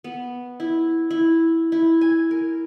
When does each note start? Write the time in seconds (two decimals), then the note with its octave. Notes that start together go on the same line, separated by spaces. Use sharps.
0.04 B3
0.60 E4
1.11 E4
1.72 E4
2.01 G#5
2.31 A#4